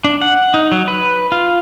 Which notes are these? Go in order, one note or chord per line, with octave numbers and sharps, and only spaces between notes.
D4
F#5
D#4
F#3
B4
F4